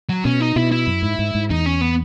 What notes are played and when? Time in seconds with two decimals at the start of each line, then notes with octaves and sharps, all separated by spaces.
0.09 F#3
0.24 B2 C#4
0.40 D#4
0.56 B2 E4
0.72 E4
0.87 F#2
1.03 G#2
1.19 G#2
1.35 G#2
1.50 E2 D#4
1.66 C#4
1.81 B3